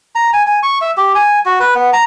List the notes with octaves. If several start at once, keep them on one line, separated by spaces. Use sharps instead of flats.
A#5
G#5
G#5
C#6
E5
G4
G#5
F#4
B4
B3
A#5